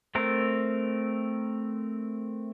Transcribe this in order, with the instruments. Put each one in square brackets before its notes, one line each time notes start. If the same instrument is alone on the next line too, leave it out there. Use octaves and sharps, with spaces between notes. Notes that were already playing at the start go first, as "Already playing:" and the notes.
[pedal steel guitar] A3 C4 A#4